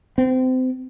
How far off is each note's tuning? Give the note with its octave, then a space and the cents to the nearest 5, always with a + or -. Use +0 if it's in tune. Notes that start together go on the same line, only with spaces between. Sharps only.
C4 -30